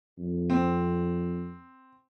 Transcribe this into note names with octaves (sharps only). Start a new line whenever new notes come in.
F2
C4